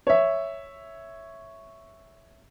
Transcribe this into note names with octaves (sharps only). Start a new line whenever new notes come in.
C#5 E5